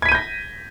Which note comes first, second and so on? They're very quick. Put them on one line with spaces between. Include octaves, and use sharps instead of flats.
G#6 B6 D#7 G6 A#6